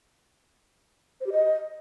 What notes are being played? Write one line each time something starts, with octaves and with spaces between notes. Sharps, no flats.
C5
G4
D#5